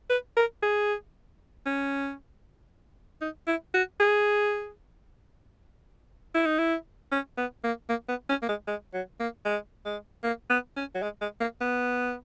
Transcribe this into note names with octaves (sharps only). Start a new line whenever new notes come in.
B4
A#4
G#4
C#4
D#4
E4
F#4
G#4
E4
D#4
E4
C#4
B3
A#3
A#3
B3
C#4
A#3
G#3
G#3
F#3
A#3
G#3
G#3
A#3
B3
C#4
F#3
G#3
G#3
A#3
B3